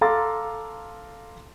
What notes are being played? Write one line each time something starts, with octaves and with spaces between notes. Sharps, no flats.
A4 F5 A#5 C6 D6 A6